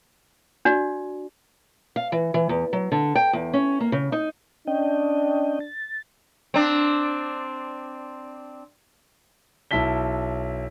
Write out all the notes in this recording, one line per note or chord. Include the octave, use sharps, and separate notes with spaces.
D4 F#4 D5
F5
E3
E3
E2
F#3
D3
G5
E2
C#4
A#3
C#3
D#4
C#4 D4 D#5 G5
A6
C4 D4
B1 E4 A5 B6 G7